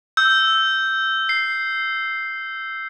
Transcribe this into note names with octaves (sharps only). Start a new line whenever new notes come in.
E6 G6
C7